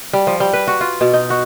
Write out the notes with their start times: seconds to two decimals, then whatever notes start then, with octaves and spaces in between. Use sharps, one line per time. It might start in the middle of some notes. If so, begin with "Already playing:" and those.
0.13 G3
0.27 F3
0.40 G3
0.53 B4
0.68 F#4
0.81 F4
1.01 B2
1.13 D#4
1.30 F#4